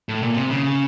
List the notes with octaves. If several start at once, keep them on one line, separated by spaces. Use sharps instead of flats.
A2
A#2
C3
C#3